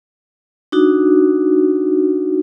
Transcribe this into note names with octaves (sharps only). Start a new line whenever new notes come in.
D4 D#4 F#4